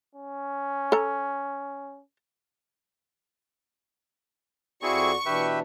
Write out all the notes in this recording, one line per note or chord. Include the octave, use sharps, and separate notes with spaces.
C#4
A4 A#5
F2 C4 E4 F#4 G#4 D5 C#6
B2 E3 D4 G4 B4 E5